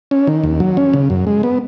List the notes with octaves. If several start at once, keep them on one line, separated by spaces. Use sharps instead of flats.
C#4
D#3
D#2
F#3
C#4
C#3
F#2
G#3
B3